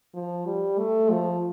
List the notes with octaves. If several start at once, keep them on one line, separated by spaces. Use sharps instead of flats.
F3
G3
A3
F3